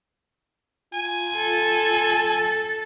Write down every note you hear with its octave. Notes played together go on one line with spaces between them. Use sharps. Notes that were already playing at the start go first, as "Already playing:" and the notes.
F4 G#5
A4